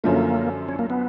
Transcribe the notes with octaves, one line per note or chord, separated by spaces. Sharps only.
F#2 D3 F3 A3 A#3
C#4
A#3
B3